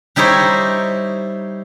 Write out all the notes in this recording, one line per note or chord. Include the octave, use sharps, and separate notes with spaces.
G3 D#4 E4 C5 C#5